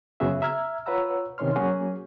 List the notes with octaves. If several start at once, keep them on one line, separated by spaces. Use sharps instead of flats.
F#2 C#3 B3 F#4 G#4 E5
E5 A#5 E6 F6 G#6
F4 B4 C#5 F#5 A#5 E6
C3 D#3 C#4 C#5 C6 F6
F#3 A#3 C#4 F#4 G#4